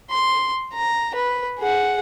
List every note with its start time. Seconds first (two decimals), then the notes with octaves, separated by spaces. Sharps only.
0.11 C6
0.74 A#5
1.15 B4
1.59 G#4 F#5